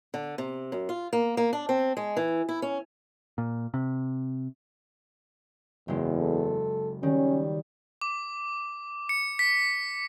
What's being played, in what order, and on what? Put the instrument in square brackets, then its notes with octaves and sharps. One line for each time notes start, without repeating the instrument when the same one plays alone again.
[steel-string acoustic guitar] D3
C3
F#2
F4
A#3
A#3
D4
C4
G#3
E3
E4
C#4
[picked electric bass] A#2
C3
[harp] F#1 G#3 [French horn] E2
[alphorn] A4
[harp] D#3 [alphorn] G3 [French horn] C#4
[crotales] D6
C#7
B6